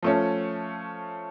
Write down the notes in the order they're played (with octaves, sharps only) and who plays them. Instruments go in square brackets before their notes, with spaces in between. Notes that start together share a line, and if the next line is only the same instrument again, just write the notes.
[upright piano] F3 A3 C#4